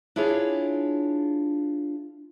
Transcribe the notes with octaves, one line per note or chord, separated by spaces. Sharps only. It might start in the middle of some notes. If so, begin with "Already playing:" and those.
D4 E4 F4 G#4 C#5